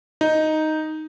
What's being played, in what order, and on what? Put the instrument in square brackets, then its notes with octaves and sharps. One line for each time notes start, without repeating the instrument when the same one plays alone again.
[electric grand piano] D#4